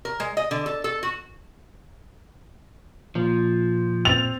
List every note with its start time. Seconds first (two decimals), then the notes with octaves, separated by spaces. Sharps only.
0.05 A#4
0.20 G#3
0.37 D#5
0.51 D3
0.66 A4
0.84 A4
1.03 F#4
3.15 A#2 F3
4.05 C4 A6 F7